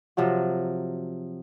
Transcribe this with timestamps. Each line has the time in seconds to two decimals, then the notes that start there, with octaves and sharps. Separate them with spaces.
0.17 C3 F3 F#3 F#4